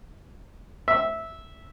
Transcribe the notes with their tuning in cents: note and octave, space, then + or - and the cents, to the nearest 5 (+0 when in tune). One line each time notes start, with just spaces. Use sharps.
E5 -10